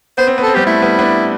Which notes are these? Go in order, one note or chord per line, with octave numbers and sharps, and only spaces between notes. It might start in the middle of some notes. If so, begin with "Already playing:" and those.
B3 C5
C4
B3 A4
C4
G3 B3 G4
A3 E4
G3 B3
B3 D4